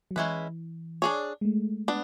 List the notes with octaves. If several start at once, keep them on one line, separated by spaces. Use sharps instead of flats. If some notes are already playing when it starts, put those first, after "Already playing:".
F#3
E3 G#3 C#4 E4 B4
D4 G#4 C#5
G#3
A3
B3 D4